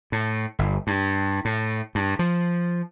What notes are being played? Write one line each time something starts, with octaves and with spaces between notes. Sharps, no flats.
A2
G1
G2
A2
G2
F3